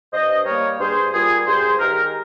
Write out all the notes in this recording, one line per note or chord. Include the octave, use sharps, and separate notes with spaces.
G2 C5 D#5
G3 A#3 A#4 C#5
G2 G#4 C5
G3 A#3 F4 G#4
G2 G#4 C5
D#3 G#3 G4 A#4